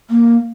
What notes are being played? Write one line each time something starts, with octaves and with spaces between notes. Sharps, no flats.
A#3